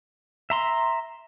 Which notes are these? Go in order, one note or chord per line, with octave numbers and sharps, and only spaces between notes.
E5 A#5 C6